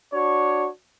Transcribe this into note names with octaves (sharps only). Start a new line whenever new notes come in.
D4 F#4 C#5